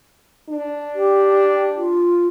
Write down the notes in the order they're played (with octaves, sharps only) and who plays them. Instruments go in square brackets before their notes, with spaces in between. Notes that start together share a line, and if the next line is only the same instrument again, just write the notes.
[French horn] D4
[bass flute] G4
F4